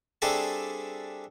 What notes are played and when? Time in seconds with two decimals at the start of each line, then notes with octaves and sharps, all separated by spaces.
0.22 G3 C4 D4 G#4 A4 E5